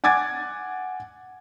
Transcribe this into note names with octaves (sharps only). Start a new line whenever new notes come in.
F#5 G#5 D6 G#6 A6